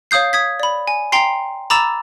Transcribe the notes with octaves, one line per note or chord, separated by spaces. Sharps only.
C#5 F5 D#6 G6 C7
D#6 G#6 B6
D5 B5
G#5
G5 A#5 C6 C7
A#5 B5 D6 E6 A6 E7